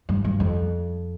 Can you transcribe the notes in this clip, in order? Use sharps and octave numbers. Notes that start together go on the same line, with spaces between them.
G2
G2
F2